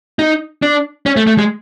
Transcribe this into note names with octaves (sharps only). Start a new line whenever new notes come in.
D#4
D4
C#4
A3
A3
G#3